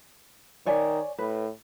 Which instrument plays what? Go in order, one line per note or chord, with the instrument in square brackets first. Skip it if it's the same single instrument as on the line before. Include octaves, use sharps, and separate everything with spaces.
[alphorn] D#3 [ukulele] C#5 D5 G#5
[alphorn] A2 [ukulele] B4